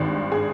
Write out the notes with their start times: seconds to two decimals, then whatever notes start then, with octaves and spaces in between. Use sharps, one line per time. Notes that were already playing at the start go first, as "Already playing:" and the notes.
Already playing: G#1 G2 D#3
0.32 G#4